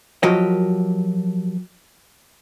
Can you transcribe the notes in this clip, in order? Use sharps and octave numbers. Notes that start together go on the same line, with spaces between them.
F3 F#3 F#4 G4 A#4 D#5